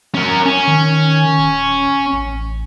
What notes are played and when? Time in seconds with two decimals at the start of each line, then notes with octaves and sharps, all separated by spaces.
0.15 C#4 A#4
0.46 C#4
0.67 D#3
1.38 D#1
2.13 A1